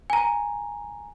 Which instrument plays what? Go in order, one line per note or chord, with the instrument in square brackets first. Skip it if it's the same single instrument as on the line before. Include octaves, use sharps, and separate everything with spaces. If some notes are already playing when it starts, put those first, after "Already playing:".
[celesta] G#5 A#5